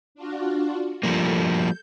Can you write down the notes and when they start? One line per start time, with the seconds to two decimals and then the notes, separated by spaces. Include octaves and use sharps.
0.15 D4 F4 F#4
1.03 F3 G3 A#3 A4
1.46 G6